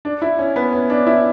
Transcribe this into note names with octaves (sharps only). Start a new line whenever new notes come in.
D4
E4
C#4
B3
C#4
D4
E4